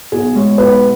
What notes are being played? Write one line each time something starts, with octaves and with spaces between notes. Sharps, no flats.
B1 G#4
G#3 C#5
B1 B4